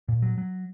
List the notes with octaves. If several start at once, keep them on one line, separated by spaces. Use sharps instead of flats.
A#2
F#3
F#3